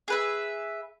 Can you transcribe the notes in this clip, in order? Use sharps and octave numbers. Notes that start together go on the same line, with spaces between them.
G#4 B4 E5